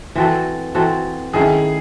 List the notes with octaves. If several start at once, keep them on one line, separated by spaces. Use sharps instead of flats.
E3 C4 F#4 A4
E3 C4 F#4 A4
D#3 A3 C#4 E4 G#4